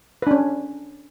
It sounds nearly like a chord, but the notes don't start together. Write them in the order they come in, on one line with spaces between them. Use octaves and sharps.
B4 D4 C#4